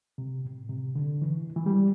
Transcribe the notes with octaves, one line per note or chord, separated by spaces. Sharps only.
C3
A2
C3
D3
E3
E3
G3